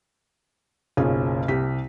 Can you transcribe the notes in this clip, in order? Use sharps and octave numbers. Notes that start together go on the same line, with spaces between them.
F#1 B1 C#4 F4 G#4
C2 G4 B6